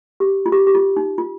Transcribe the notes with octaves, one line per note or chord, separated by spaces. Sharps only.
G4
F4
G4
G4
F4
D#4
F4